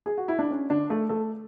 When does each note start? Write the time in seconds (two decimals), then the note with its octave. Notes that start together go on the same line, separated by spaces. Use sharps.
0.06 G#4
0.18 F#4
0.28 E4
0.39 D4
0.51 C#4
0.70 D3 D4
0.90 A3 A4
1.09 A3 A4